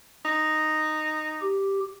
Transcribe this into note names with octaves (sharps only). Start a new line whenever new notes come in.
D#4
G4